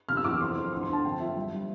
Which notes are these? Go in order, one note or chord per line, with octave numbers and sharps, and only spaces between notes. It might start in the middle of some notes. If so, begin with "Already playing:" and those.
C3 F6
E6
E2 D6
F2 C6
F2
D2 C6
D3 C6
A5
F2 G5
F3 E5
G3
G3